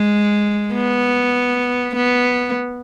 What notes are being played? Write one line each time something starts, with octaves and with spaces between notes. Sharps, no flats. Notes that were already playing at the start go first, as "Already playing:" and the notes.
Already playing: G#3
B3
B3